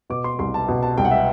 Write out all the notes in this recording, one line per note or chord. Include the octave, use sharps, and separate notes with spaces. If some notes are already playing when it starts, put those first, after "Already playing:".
B2 D6
C6
C2 C6
A5
B2
A5
C2 G5
F#5
E5